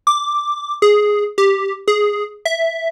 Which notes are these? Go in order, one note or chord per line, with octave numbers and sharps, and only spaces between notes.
D6
G#4
G4
G#4
E5